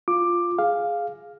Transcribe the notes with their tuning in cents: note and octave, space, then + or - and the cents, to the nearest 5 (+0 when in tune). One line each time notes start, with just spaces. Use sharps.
F4 +0 D6 +10
G#4 +5 F5 +0